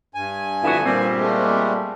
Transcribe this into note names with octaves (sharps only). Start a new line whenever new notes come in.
G2 G#5
F2 D3 B3 E4 F#4
A#2 G3 C4
G#3 A3